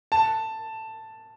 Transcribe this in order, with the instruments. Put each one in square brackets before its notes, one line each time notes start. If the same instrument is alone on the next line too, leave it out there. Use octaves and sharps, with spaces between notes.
[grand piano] A5